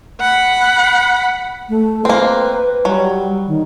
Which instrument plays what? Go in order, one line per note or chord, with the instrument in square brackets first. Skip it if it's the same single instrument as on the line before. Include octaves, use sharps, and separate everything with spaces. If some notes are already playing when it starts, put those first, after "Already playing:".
[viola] F#5 B5
[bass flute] A3
[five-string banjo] A#3 C4 [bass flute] B4
[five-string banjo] F#3 [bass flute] G3
[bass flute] D#3